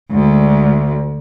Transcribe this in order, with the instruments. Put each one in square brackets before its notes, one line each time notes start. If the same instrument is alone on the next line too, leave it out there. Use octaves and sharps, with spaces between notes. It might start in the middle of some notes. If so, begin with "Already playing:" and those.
[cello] D2 [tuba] G#3